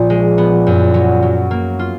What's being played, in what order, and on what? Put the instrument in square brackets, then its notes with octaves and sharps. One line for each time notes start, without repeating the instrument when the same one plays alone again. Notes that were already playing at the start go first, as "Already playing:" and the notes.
Already playing: [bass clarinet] A#2 [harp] F3 B3
[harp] G#3
B3
F#2
F#3
F#3
A#3
F4